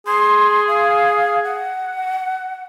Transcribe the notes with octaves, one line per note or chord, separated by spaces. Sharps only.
G#4 C6
F5
F#5